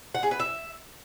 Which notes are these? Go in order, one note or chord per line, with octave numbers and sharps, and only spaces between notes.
F#5
G#4
B4
E5